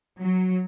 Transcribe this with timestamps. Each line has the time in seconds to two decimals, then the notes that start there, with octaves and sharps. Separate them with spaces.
0.21 F#3